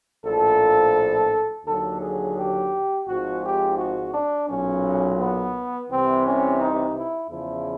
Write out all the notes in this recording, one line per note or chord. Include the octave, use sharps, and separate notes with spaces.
A#1 A2 F3 A4
D#2 D3 F#3 A4
G#4
G4
G#1 G#2 F3 F#4
G4
F#4
D4
B1 A#2 F#3 C#4
B3
C2 C3 E3 C4
C#4
D#4
E4
E2 C#3 F3 E4